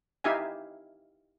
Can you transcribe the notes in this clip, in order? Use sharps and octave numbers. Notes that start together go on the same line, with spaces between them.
D#4 E4 G4 E5 F5 G#5